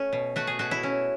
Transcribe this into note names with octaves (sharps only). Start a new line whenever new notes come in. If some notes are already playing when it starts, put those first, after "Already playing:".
Already playing: A3 C#4
B2
A3 F#4
G#4
B2 F#4
E4
C#4